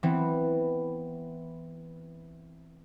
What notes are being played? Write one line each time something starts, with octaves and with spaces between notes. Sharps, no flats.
E3 B3 C4